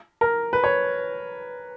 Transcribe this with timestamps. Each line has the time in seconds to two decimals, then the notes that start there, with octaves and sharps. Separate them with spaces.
0.21 A#4
0.53 B4
0.64 C#5